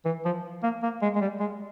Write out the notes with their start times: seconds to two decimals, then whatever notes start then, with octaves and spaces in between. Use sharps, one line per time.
0.05 E3
0.25 F3
0.63 A#3
0.83 A#3
1.02 G#3
1.16 G#3
1.21 G3
1.40 G#3